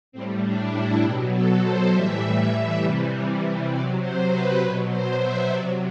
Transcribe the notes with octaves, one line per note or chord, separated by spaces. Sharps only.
A2 G3 C4
D4
E4
B2 F#3 G4
A4
C5
A2 E3 G3 E5
C3 E3 G3
C3 F#3 D5
C5
B4
B2 F#3 B4
C5
E5
C3 F#3 D5